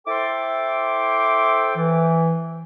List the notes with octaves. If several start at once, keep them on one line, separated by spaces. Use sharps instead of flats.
E4 A4 C5 G5 C6 D6
E3